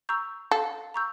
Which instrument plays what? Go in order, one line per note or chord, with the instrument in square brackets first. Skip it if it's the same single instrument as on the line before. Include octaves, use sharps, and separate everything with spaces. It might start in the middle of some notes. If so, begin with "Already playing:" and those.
[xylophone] A#5 C#6 E6 G6
[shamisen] A4 [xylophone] F5
[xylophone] A#5 C#6 E6 G6